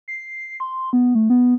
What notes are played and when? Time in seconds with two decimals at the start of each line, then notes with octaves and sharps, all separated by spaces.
0.08 C7
0.60 C6
0.93 B3
1.15 A3
1.30 B3